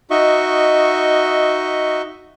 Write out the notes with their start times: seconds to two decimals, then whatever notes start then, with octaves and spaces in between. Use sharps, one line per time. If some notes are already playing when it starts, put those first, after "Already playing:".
0.11 D#4 F#4 D#5 E5 C#6